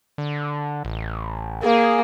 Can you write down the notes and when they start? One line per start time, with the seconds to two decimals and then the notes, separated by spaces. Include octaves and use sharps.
0.18 D3
0.85 A1
1.63 A#3 G#4